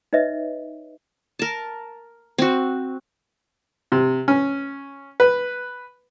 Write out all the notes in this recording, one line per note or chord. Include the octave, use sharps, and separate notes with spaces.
D#4 B4 C#5 D#5 E5
A#4 A5
C4 F#4
C3
C#4
B4